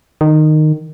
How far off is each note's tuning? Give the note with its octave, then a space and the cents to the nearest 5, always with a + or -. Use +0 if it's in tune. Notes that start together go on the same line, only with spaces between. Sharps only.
D#3 -15